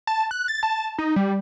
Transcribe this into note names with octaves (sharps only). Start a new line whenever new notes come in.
A5
F#6
A6
A5
D#4
G3